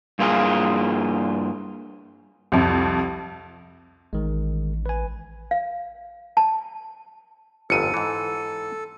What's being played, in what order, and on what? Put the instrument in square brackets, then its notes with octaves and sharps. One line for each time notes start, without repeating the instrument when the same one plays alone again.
[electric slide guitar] G2 A#3 F4 G#4
[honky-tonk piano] C2 F2
[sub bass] A1 [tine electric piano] D#3 G#3
[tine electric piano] B4 G#5
[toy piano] F5
A5
[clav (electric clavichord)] G1 F2 G#2 [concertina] A4 [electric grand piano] C#7 D#7
[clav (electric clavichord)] G#2 E3